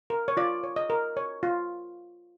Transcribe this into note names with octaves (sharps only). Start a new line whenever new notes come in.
A#4
C#5
F4 D5
C#5
D#5
A#4
C#5
F4